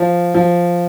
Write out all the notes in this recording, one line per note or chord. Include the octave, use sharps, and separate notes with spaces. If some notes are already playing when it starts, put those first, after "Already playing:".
Already playing: F3
F3